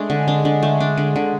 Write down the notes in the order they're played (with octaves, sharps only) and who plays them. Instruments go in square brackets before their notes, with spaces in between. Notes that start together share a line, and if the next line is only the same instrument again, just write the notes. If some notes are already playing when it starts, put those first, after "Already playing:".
Already playing: [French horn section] G#3 [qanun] A3 D4
[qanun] D3
D4
D3
A3
D4
D3
D3